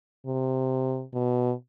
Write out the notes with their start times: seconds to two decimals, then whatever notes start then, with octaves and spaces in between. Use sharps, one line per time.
0.26 C3
1.14 B2